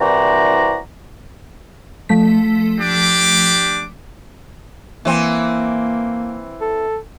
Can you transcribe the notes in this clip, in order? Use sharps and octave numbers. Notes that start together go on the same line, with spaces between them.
C2 E3 F#4 C5 D5 A#5
F3 A3 B6
D4 G4 D6
E3 A#3 C4
A4